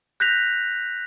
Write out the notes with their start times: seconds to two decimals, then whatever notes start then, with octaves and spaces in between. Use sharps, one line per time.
0.20 F#6 G6 A#6 B6 F7